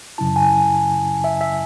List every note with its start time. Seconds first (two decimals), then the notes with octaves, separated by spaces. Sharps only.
0.18 F#2 C#3 F#3 C#4 E4 A5
0.36 G#5
1.24 E5
1.41 E5